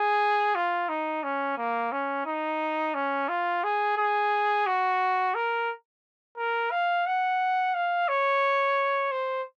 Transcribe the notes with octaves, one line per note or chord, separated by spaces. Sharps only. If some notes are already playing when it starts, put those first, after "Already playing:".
Already playing: G#4
F4
D#4
C#4
A#3
C#4
D#4
C#4
F4
G#4
G#4
F#4
A#4
A#4
F5
F#5
F5
C#5
C5